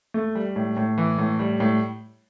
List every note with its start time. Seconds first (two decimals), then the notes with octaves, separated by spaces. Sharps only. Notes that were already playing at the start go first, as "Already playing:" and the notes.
0.14 A3
0.35 G3
0.56 A2
0.77 A2
0.98 E3
1.18 A2
1.39 G3
1.60 A2